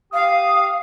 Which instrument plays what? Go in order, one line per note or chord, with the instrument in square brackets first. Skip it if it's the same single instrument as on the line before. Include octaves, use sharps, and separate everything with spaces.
[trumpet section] G4 D#6 [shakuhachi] F5